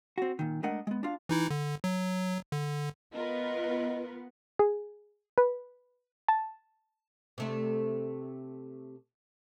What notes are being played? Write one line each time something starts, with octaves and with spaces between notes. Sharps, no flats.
C4 F#4
A#2 D#3
G#3 A3 D4 A#4 D#5 F#5
G#3 B3
D4 F4 F5
E3 D#4 E4
D3
F#3
D3
B3 F4 A#4 B4 D#5
G#4
B4
A5
C3 A3 D4